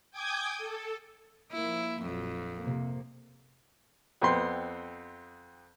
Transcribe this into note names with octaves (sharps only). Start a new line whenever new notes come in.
G5 G#5 D6 D#6 G6 G#6
A4
F3 A#3 E4
A#1 F2 F#3
C3 A#3
F2 B3 C4 C6